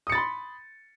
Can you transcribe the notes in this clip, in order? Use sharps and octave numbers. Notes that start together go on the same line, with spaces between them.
B5 C6 D#6 A6 C#7